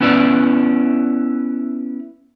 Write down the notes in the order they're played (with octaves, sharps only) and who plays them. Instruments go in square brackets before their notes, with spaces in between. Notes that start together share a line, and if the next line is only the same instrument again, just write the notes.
[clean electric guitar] B3 C#4 E4 B4 D5